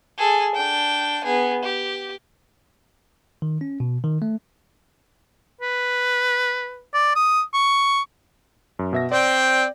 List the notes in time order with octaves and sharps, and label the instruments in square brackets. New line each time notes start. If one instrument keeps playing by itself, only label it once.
[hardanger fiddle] G#4 A4
D4 G5
B3 G#4
G4
[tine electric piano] D#3
C#4
B2
D#3
A3
[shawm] B4
D5
D#6
C#6
[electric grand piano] F#2
B2 E5 A#6
[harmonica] C4 G5 [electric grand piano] D5